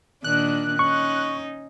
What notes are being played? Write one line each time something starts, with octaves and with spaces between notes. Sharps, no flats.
A#2 D#3 D4 F#6
C#4 D#4 C#6